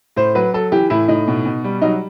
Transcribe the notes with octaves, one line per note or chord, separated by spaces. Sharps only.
A2 C5
F#3 B4
F#3 A4
E3 G4
A2 E4
A2 D#4
B2
B2
G3
F#3 D#4